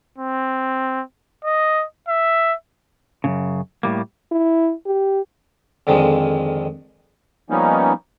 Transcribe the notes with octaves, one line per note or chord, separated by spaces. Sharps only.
C4
D#5
E5
F#2 A2 C#3
A2 G3 A#3
E4
G4
F2 D3 D#3 F3 G#3
F3 G3 A#3 B3 C#4 D#4